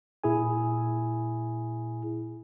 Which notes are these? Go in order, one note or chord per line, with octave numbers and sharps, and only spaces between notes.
A#2 E4 G#4 G#5